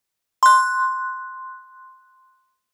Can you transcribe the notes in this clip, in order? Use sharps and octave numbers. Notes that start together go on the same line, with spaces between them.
C6 F#6